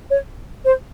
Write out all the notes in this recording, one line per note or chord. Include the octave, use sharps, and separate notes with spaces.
C#5
C5